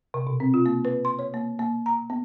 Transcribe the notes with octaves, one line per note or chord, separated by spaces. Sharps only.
C3
B2
C4
F4
A#3
B4
C6
C#5
A#3
A#3
A#5
B3